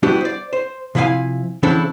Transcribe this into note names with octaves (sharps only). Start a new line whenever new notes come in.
G3 B3 D4 E4 F#4 G4
C5 D5
C5
C3 F3 E4 E5 F5 G#5
C#3 E3 C4 D4 E4 A4